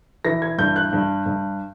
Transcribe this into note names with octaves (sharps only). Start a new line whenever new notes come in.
E3 A#6
G#6
G2 G6
F#6
G2
G2